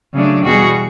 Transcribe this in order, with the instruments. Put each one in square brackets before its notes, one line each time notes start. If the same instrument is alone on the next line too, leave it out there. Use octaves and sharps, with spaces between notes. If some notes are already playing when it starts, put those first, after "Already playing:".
[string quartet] C#3 F#3 A3 D4
E2 B2 G3 B3 F#4 G#4